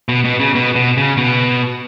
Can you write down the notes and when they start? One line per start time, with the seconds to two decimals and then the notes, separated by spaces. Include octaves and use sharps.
0.09 B2
0.24 B2
0.40 C#3
0.55 B2
0.76 B2
0.97 C#3
1.17 B2